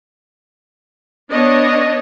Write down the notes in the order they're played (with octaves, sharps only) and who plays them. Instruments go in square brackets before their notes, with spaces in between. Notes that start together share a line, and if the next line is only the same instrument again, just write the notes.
[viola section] B3 D4 C#5 D#5